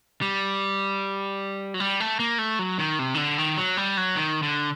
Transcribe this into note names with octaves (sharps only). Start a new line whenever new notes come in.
G3
F#3
G3
A3
A#3
A3
F#3
D#3
C3
D#3
D3
D#3
F#3
G3
F#3
D#3
D3